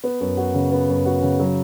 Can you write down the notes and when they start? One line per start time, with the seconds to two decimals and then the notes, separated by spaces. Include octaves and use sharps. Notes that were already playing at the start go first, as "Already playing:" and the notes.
0.04 B3
0.21 F#2
0.37 F#4
0.54 C#3
0.71 B3
0.89 F#2
1.05 F#4
1.22 C#3
1.39 F#3